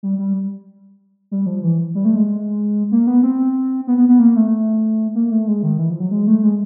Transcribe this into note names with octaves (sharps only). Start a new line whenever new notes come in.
G3
G3
G3
F3
E3
G3
A3
G#3
A#3
B3
C4
B3
B3
B3
A#3
A3
A#3
A3
G#3
D#3
E3
F3
F#3
G#3
A3
G#3